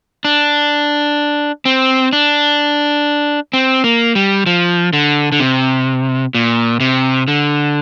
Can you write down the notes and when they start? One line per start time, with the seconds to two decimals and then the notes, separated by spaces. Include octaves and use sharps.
0.25 D4
1.65 C4
2.13 D4
3.53 C4
3.84 A#3
4.15 G3
4.46 F3
4.93 D3
5.32 D3
5.40 C3
6.34 A#2
6.80 C3
7.28 D3